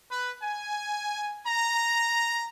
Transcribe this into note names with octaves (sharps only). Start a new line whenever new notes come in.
B4
G#5
A#5